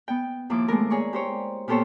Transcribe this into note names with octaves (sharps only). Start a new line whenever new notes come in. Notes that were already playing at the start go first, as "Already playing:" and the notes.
B3 G5
D#2 F3 A#3 E4 D6
G#3 A3 B3 A#4
G#4 C#5 D5 G#5 C#6
G4 C5 C#5
A#2 B3 G4 A4 C5 C#5